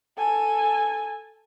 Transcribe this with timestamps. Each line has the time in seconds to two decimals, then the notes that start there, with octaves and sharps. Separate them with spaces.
0.18 A4 G#5